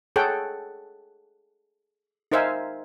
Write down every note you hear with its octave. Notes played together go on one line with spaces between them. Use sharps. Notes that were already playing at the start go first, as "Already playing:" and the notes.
G#4 A4 C#5 F#5 G5
D#4 A#4 C5 E5 F5 G#5